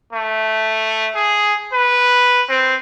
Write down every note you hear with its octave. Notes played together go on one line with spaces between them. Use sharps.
A3
G#4
B4
C4